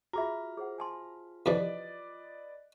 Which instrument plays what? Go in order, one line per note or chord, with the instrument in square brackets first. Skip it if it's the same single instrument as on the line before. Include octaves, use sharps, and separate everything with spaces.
[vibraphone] F4 [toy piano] F#4 G#4 E5 [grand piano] A#5 B5
[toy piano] G#4 C5 F#5
G#5 A5 C6
[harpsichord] F2 C3 E3 [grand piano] B4 D5 D#5